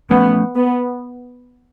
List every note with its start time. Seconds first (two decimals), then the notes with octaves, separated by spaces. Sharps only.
0.10 F3 A3 B3 C#4
0.55 B3